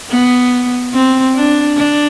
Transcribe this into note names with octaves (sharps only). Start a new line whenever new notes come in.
B3
C4
D4
D4